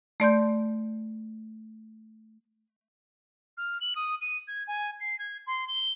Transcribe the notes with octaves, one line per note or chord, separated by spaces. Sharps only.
A3 D5 C6 G6
F6
F#7
D#6
D#7
G#6
G#5
C7
G#6
C6
G7